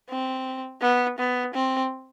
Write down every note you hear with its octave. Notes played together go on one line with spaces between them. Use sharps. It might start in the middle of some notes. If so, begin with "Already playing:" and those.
C4
B3
B3
C4